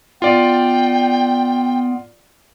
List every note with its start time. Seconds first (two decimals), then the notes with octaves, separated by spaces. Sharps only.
0.22 B3 F4 D5 G5